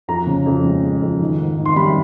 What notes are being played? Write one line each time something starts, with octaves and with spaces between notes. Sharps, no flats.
F2 A#5
C#3
F2
G#3
G#3
F2
D#3
G#2
D#3
C6
G3 B5